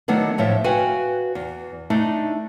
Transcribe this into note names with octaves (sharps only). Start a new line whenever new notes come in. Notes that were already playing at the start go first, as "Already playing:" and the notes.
D#3 F#3 A3 B3 D4
A2 F3 A3 C#5 E5
F#4 B4 F5 G5 G#5
E2
A3 D4 D#4